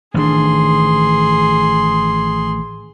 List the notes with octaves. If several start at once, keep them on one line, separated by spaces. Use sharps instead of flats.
A1 D#3 D4 G#4 C6